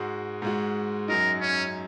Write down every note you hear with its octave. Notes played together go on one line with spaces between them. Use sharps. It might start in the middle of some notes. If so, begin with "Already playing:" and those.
Already playing: G#2 G#3 F#4
G#2 G#3 F#4
F#2 F#3 D#4 A#4
C#4